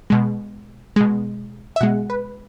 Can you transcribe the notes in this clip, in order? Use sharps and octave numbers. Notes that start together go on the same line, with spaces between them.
B2 G#3
B2 G#3
E5
B2 G#3 F#5
B4